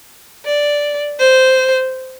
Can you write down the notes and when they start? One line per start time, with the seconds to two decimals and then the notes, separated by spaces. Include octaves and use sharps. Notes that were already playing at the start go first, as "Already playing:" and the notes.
0.45 D5
1.20 C5